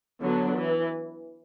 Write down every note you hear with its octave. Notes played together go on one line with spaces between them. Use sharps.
D3 F#3 B3 D4
E3